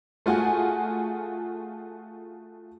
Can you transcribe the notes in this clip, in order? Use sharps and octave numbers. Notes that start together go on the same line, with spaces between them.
A3 F4 F#4 G#4 G#5